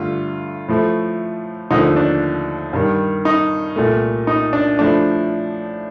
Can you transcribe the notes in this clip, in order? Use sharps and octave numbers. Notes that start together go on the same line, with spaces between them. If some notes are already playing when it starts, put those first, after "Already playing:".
Already playing: G2 D3 A3 F4
A2 F3 A3
D#2 D3 F3 A3 D#4
D4
G2 D#3 G3
D#4
C2 A#2 A3
D#4
D4
A2 F3 A3 D4